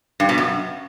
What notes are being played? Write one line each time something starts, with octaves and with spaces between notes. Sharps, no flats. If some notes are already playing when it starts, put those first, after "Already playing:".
G2
B2
F#2